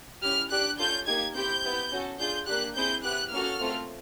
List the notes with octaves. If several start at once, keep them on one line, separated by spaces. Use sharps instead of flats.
C#4 E4 G4 F6
D4 G4 F#6
C#4 F4 A4 G6
A#3 D#4 G4 G#6
C4 E4 G4 G6
B3 E4 G4
C#4 F#4 A4
D4 F4 G#4 G6
A#3 D4 G4 F#6
C4 E4 G#4 G6
B3 E4 G4 F#6
A#3 C#4 F#4 A4 F6
A3 C4 F4 A4